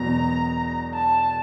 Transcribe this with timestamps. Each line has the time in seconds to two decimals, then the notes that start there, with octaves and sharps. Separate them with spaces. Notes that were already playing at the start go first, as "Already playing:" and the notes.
Already playing: E1 E2 B2 F#3 B3 A#5
0.95 A5